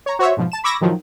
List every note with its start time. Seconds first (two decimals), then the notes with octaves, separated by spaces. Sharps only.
0.06 C#5 A#5
0.19 F#4 C5 C#5 E5
0.37 G#2 B2 F3
0.52 A5 E7
0.64 B5 C#6 D6 E6 G#6 A#6
0.81 A2 D#3 F3 F#3